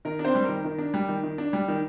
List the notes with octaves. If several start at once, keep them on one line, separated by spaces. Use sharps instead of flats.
D#3 A#4
D4
C4 C5
G3
D#3 A#4
D#3
D4
G3
D#3
D#3
D4
G3
D#3